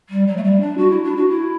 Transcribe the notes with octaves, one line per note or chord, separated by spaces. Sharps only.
G3
F#3
A3
G3
D4
F#4
E4
D4
F#4
E4